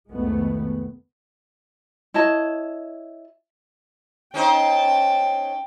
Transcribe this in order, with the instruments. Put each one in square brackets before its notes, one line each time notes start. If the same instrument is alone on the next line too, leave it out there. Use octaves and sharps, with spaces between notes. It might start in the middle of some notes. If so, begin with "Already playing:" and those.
[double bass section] F1 C2 D#3 G#3 A3 B3
[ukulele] E4 C#5 D#5 A5
[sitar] C#4 D#4 C5 [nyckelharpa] G5 A5